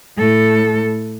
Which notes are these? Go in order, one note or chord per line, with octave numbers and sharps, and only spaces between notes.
A2 A4